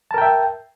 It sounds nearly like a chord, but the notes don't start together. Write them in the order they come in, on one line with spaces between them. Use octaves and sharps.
A5 A#4 G5 E5